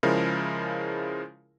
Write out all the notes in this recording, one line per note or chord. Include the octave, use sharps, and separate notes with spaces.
C#3 F3 G#3 E4 A#4